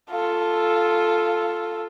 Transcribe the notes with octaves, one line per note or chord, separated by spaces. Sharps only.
F4 A4